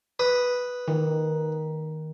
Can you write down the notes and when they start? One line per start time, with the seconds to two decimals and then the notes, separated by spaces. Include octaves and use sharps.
0.19 B4 D#6
0.88 D#3